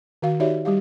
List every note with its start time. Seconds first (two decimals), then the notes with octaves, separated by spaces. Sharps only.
0.22 D#3 F#4 F5
0.40 D#4 F#4 G4 C#5 D5 E5
0.65 G3 G4 F5